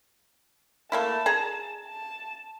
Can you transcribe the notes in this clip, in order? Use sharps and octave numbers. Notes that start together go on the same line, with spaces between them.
A3 A#3 E4 A5
G#4 A#5
A5